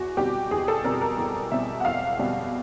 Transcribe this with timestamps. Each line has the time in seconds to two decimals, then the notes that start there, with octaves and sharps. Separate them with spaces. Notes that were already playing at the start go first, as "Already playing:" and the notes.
Already playing: E2 F#4
0.17 B2 G3 C4 G4
0.51 E2 G#4
0.68 A4
0.84 B2 G3 C4 A#4
1.01 A#4
1.18 E2
1.52 B2 G3 C4 E5
1.80 F#5
1.85 E2 F5
2.19 B2 G3 C4